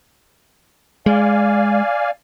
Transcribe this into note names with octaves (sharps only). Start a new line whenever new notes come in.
G#3 D5 F5 G#5